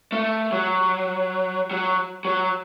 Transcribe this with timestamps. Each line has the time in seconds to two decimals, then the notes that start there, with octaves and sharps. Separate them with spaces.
0.12 A3
0.52 F#3
1.71 F#3
2.25 F#3